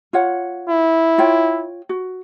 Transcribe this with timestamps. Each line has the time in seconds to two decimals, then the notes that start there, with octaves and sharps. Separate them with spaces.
0.13 F4 C#5 F#5
0.69 E4
1.18 F4 C#5 G5
1.89 F#4